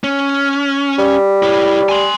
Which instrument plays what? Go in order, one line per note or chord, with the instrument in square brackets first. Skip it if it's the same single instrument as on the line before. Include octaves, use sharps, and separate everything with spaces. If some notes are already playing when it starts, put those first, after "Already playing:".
[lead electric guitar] C#4
[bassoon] G3
[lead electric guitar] E4 C#5
G#5 C6